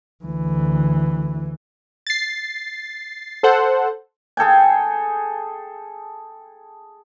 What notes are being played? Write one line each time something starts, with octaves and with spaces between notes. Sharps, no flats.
D2 E3
A6 C7
A4 C5 F#5
G#4 A4 G5 G#5